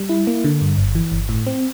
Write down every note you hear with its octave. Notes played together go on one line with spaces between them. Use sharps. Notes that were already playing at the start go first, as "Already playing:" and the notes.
Already playing: G3
E4
A#3
D3
G2
G1
E3
G1
A2
C4